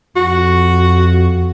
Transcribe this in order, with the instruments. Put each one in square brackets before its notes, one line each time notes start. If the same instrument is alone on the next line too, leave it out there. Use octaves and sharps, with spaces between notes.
[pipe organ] F2 [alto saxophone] F#4